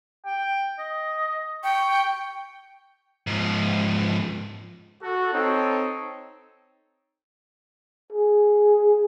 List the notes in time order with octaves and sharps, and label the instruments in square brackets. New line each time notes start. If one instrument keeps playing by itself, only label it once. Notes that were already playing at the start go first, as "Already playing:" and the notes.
[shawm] G5
D#5
[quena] G5 [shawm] C#6
[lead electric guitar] G#2 F3
[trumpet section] F#4 A4
C4 D#4 A4 C#5
[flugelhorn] G#4